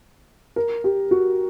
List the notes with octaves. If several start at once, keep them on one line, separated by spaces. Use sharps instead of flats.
A#4
G4
F#4